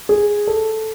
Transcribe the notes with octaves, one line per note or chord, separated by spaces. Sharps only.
G#4
A4